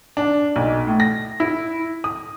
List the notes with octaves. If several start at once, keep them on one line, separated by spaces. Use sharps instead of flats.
D4
B1
A2
A#6
E4
D#6